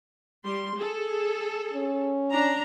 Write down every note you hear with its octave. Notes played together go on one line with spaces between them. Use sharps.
G3 C6
G#4 A4
C#4
D4 A#5